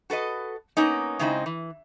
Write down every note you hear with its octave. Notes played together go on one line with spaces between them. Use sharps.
F#4 A4 B4 D#5
A#3 B3 C#4 D#4
C#3 G#3 C4 D#4 E4 C5
E3